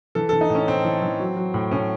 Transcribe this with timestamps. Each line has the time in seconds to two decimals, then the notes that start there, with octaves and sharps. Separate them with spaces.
0.15 E3 A4
0.29 E3 A4
0.41 D#4
0.50 A2
0.55 C#4
0.68 A2 C4
0.85 E3
1.03 E3
1.20 F#3
1.37 F#3
1.54 A2
1.71 A2 C#4